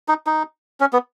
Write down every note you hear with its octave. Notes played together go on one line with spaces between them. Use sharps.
D#4
D#4
C#4
B3